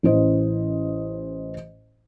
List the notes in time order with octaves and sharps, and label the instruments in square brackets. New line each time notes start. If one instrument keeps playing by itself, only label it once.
[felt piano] A1 E3 C#4 C5 D#5